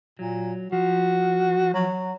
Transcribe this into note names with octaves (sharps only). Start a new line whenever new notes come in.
A#2 F#3
F3 F#4
F#3